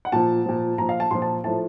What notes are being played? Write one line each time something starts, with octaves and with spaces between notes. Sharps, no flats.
F#5
A#2 F3 A5
A#2 F3
A#2 F3 A#5
F5
A5
A#2 F3 C6
A5
A2 F3 A5